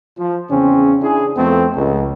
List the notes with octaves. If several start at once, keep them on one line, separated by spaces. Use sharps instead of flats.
F3
E2 C#3 C4 C#4
D4 E4 G#4
F2 A3 B3 C4
C#2